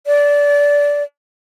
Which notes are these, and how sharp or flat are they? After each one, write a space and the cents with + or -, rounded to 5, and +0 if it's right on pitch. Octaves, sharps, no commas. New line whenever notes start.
D5 -20